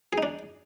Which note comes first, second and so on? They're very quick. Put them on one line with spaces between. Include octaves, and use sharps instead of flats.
G#4 D#4 D4